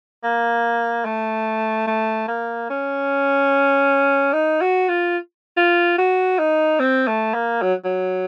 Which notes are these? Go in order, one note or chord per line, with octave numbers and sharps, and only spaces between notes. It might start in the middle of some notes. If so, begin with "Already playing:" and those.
A#3
A3
A3
A#3
C#4
D#4
F#4
F4
F4
F#4
D#4
C4
A3
A#3
F#3
F#3